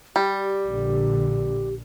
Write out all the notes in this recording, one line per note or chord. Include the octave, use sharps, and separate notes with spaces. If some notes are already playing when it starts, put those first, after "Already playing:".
G3 G4
A#1 A#2 D3